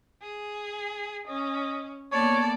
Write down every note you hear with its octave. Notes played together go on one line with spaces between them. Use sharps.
G#4
C#4 D#5
A#3 B3 A4 C#5 D5